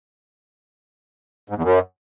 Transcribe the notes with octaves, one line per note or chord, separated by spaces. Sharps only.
G#2
E2
F#2